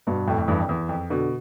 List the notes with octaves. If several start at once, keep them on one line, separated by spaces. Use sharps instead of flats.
G2 B2
F2 A2
F2 A2
E2 G2
F2
E2
F2
B2 D3